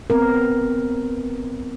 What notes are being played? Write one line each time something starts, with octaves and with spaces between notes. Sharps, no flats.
B3 C4 A#4